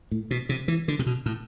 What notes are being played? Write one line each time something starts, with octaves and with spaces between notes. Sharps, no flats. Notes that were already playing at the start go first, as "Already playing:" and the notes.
A2
B2
C3
E3
D3
C3
B2
A2